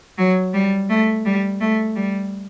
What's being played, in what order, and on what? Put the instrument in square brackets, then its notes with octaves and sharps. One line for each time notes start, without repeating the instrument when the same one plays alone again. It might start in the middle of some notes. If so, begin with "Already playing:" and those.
[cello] F#3
G3
A3
G3
A3
G3